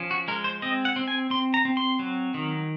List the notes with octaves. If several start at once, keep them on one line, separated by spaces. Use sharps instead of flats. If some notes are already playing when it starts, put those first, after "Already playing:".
Already playing: F3 C#4
F#4
G#3 A#4
C5
C4 D#5
F#5
C4
G#5
C4 C6
A#5
C4
C6
F#3
D#3